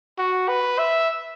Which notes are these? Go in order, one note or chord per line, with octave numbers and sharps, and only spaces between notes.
F#4
B4
E5